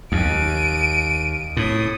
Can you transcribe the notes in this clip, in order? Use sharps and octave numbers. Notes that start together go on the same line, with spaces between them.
D#2 D7 D#7
A2 D#6